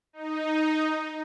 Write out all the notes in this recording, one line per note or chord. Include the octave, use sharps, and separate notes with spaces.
D#4